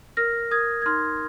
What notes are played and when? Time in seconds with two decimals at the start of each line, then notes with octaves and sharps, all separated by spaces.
0.17 A#4 F6 A#6
0.51 A#4 D#6 G#6
0.82 G#6
0.86 D#4 C6 F6